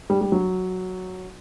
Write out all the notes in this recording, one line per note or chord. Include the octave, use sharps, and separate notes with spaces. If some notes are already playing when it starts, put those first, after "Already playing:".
G3
G3
F#3